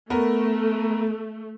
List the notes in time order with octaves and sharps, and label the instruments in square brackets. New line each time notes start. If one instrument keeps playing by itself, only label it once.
[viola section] A3 [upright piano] B3 A#4